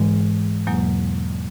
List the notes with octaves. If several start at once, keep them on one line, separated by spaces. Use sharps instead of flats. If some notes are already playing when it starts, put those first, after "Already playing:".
Already playing: G#2 E3 G#3
E2 B2 F#3 A#3